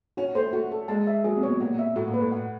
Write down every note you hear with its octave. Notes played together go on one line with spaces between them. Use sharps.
C#4 F#4
A3 C5
A3 F#4
A4
G#3 A5
E5
F#3 G#4
C3
B2 C#5
A#2 F#4
E5
A2 F#4
A#2
B4
A2
F#5